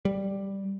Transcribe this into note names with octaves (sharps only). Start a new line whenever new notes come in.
G3